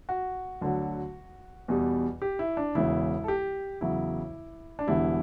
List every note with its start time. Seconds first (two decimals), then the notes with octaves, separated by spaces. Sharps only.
0.09 F#4
0.61 D2 D3 F#3
1.68 E2 B2 G3
2.22 G4
2.39 E4
2.57 D4
2.75 E1 E2 C#3 E4
3.24 A4
3.28 G4
3.81 E2 C#3 F#3 E4
4.79 D4
4.87 E1 E2 D3 G3 E4